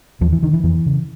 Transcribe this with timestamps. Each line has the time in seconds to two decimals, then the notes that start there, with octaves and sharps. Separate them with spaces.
0.21 D#2 F3
0.32 E3
0.43 D3 D#3
0.53 E3
0.64 F2 E3
0.86 C#3